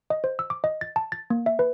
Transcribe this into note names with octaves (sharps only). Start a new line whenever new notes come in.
D#5
C5
E6
D6
D#5
A6
A5
A6
A#3
E5
B4